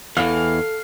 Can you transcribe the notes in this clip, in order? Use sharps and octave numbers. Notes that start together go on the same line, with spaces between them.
E2 E3 A4 F5